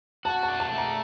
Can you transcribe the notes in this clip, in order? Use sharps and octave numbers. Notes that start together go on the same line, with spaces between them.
F#4 A5
A5
D4
A5
A3
A#5